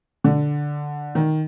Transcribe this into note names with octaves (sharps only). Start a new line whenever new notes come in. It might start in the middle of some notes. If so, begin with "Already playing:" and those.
D3
D#3